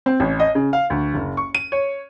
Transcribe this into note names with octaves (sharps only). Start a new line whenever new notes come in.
C4
A1
D#5
C#3
F5
D2
F#1
C#6
D#7
C#5